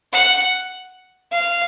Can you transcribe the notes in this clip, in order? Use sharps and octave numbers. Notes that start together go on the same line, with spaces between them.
F#5
F5